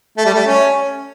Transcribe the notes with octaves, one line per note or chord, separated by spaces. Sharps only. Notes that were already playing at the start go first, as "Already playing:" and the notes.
A3
G3
A3
C#4